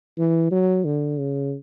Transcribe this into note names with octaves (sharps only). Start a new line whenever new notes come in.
E3
F#3
D3
C#3